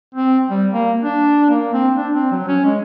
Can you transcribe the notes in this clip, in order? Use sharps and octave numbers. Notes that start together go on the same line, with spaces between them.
C4
G3
A#3
D4
A#3
C4
D4
C4
F#3
C#4
G#3